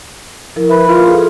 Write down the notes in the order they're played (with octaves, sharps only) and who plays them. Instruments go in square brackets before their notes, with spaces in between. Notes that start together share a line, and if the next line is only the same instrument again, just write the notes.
[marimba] F3 E4 A#4
[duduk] B4 [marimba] E5 B5
[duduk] F4 [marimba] A#4 B4
[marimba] G#4 A4